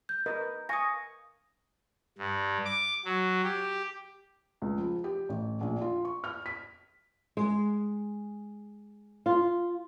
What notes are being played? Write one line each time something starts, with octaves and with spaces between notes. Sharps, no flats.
G6
A#4 B4 D#5
F5 G#5 C#6 D#6 A#6
G2
D6
F#3
G4
C#2
F3
G4
A1
A#1
F4
C#6
F6
B6
G#3
F4